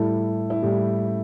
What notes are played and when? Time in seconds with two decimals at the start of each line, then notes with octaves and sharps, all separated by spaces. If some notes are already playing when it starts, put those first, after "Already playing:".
Already playing: A2 G3 E4 A4
0.50 E4
0.62 A2 G3 G4